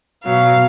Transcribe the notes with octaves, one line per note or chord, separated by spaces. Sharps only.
B2 F#3 F5